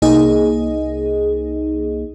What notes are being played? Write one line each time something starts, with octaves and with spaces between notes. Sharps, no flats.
C2 A#3 D#4 G#4 D#5